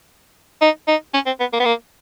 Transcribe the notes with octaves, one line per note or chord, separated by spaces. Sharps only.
D#4
D#4
C#4
C4
B3
A#3
B3
A#3